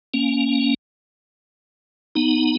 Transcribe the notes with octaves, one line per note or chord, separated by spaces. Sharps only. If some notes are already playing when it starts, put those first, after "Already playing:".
A#3 C#4
B3 D#4